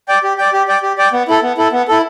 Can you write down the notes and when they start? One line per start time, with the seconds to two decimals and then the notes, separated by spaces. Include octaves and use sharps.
0.08 D5 G5
0.23 G4
0.38 D5 G5
0.53 G4
0.68 D5 G5
0.83 G4
0.98 D5 G5
1.13 B3
1.28 E4 A4
1.43 B3
1.58 E4 A4
1.72 B3
1.88 E4 A4